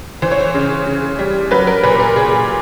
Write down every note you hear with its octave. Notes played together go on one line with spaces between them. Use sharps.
E3 C5
C#5
C5
C#3
C#3
G3
F#3 B4
A#4
A#2 B4
A#4
A#2 G#4